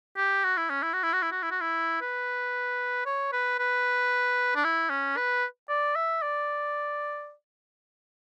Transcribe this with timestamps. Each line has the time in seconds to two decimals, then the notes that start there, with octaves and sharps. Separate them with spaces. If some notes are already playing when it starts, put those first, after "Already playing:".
0.17 G4
0.44 F#4
0.57 E4
0.70 C#4
0.83 E4
0.93 F#4
1.03 E4
1.13 F#4
1.22 E4
1.32 F#4
1.43 E4
1.51 F#4
1.61 E4
2.01 B4
3.06 C#5
3.33 B4
3.59 B4
4.56 D4
4.65 E4
4.90 C#4
5.17 B4
5.69 D5
5.96 E5
6.22 D5